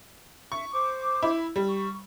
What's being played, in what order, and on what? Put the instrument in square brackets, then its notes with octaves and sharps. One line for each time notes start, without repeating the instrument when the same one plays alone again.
[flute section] E5 [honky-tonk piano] C#6
[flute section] C5 D6
[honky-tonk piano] E4
G3
[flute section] C#6